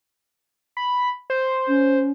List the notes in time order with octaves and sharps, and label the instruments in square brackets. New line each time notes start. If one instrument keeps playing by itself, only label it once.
[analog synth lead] B5
C5
[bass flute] C#4